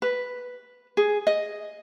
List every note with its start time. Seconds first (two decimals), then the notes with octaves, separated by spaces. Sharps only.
0.02 B4
0.97 G#4
1.27 D#5